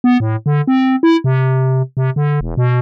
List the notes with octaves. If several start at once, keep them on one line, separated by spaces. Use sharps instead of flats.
B3
A2
D3
C4
E4
C3
C3
D3
E1
B2